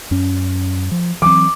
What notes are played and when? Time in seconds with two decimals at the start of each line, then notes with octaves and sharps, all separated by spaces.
0.11 F#2 C#4
0.92 F3
1.22 E3 F#3 C4 D6